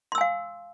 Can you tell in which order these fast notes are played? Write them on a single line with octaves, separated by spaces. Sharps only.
C6 E6 G#5 F5